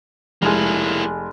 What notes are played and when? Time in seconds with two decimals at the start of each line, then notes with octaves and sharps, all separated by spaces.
0.42 F1 G#3 A#3 E4